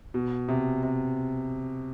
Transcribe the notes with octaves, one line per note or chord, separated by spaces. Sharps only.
B2
C3
C3